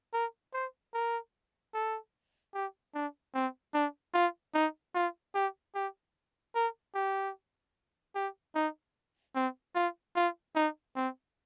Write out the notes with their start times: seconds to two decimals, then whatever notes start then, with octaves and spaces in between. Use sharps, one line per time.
0.13 A#4
0.54 C5
0.94 A#4
1.74 A4
2.54 G4
2.94 D4
3.34 C4
3.74 D4
4.14 F4
4.54 D#4
4.95 F4
5.35 G4
5.75 G4
6.55 A#4
6.95 G4
8.15 G4
8.55 D#4
9.35 C4
9.75 F4
10.16 F4
10.55 D#4
10.96 C4